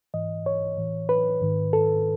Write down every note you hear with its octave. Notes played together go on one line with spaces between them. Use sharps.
G#2 E3 D#5
C#5
A2 E3
B4
G#2 D#3
A4